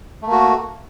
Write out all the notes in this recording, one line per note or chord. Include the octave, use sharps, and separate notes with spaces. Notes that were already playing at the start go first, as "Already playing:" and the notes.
A3 A#3 F#4